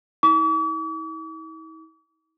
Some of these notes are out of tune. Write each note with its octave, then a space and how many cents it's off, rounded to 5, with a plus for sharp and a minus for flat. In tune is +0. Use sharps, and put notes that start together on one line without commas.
E4 -45 D6 -45